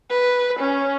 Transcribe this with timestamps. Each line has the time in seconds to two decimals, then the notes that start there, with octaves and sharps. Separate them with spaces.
0.10 B4
0.60 C#4